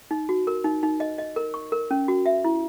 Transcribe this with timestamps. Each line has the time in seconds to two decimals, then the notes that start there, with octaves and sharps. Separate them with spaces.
0.11 D#4
0.29 F#4
0.47 A#4
0.64 D#4
0.83 D#4
1.00 D#5
1.18 D#5
1.36 A#4
1.54 C#6
1.72 A#4
1.91 C#4
2.08 F#4
2.26 E5
2.45 E4